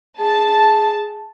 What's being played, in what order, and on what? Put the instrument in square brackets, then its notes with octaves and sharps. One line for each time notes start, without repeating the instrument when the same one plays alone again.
[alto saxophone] G#4 [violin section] A5